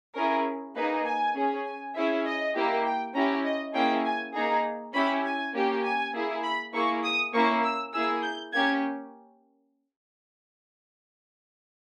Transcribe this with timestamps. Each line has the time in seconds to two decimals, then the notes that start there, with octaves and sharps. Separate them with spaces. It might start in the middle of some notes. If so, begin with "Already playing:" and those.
0.15 C#4 E4 G#4 A#4
0.75 A#3 D#4 G#4 B4
1.05 G#5
1.35 C#4 G#4
1.65 G#5
1.95 C#4 E4 G#4 E5
2.25 D#5
2.55 A#3 E4 G4
2.85 G5
3.14 C#4 E4 G4 A#5
3.45 D#5
3.74 A#3 C#4 E4 G#4 G5
4.05 G#5
4.34 A#3 D#4 G#4 A#5
4.94 C#4 E4 G4 B5
5.24 G#5
5.54 A#3 C#4 G4
5.84 G#5
6.13 A#3 E4 G#4
6.44 B5
6.74 A#3 E4 G#4 C#6
7.03 D#6
7.33 A#3 C#4 E4 C#6
7.63 E6
7.93 A#3 E4 G#4 E6
8.23 G6
8.53 A#3 C#4 G4 G#6